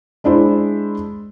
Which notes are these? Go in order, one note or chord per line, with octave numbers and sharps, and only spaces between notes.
G#3 D4 E4 C5